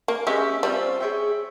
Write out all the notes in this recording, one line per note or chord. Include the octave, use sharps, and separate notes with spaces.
A#3
G#3 C#4 G4 C#5 E5
G3 C4 F4 C5 E5
G#4 C#5 E5 G5